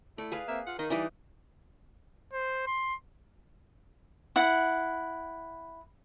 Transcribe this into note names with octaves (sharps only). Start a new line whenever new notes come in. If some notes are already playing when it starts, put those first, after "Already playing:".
A3 E4 D5
G#4 B4 F5
A#3 C4 E5
F4 F5 F#5
D#3 D#5
E3 G3 D#4 B4 D5
C5
C6
E4 F#5